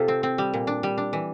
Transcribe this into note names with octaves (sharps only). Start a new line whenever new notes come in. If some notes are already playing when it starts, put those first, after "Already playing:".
Already playing: C3 F4 A4
C4
C4
G3
A#2
D4
G3
D4
E3